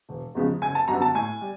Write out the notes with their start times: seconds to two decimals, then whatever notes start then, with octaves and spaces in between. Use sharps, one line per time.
0.09 E1
0.35 E2 C#3 F3 G#3
0.61 F#1 G#5
0.75 A5
0.88 F#2 D3 G3 B3 A#5
1.02 A5
1.15 A2 G#5
1.41 G3